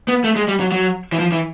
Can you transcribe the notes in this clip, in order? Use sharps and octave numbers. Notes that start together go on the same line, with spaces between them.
B3
A3
G#3
G3
F#3
F#3
E3
F3
E3